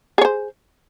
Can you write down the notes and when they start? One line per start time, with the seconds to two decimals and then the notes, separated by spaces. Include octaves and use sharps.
0.18 G#4
0.21 C#5
0.25 C5